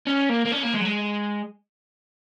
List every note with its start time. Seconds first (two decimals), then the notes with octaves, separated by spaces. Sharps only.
0.07 C#4
0.29 A#3
0.45 A#3
0.52 C#4
0.63 A#3
0.74 G#3
0.81 F#3
0.85 G#3